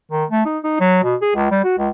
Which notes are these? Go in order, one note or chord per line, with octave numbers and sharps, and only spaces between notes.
D#3
A3
D#4
D#4
F#3
B2
G#4
C#2
G3
F#4
C#2